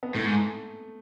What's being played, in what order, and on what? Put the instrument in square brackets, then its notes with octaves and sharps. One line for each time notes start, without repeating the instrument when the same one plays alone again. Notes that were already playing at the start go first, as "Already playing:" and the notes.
[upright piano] B3
[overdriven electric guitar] A2 [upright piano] A3
[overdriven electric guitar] G#2